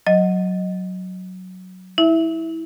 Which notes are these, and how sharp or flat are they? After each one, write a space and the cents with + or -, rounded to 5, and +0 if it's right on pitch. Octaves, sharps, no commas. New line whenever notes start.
F#3 +0 D#5 +0
E4 -20 E5 +0